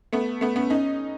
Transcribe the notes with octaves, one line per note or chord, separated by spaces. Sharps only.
A3 B3
A3 B3
B3 C#4
C#4 D#4